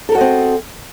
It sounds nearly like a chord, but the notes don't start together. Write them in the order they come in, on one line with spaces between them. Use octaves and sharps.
A4 A#4 F#4 D#5 C4